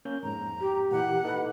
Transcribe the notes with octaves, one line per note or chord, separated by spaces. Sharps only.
A#3 C#4 G6
F2 G#2 A#5
G4
A#2 E3 E4 F#5
D#4 A4 B4